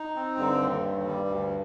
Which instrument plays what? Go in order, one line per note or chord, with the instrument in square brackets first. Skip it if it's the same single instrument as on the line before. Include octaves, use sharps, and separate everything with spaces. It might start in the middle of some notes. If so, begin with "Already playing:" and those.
Already playing: [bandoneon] D#4
C4
[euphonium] G2 [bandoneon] D3
[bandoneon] D#2
D#2
G3
D2